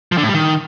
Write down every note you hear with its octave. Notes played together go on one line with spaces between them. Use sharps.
F3
D3
A2
G3
D#3